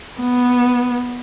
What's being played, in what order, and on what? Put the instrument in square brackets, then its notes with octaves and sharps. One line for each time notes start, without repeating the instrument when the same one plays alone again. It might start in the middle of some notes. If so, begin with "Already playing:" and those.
[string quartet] B3